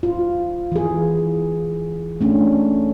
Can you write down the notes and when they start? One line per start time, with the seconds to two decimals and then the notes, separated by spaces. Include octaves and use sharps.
0.03 F4
0.72 E3 G#4
2.21 A3 C#4 D4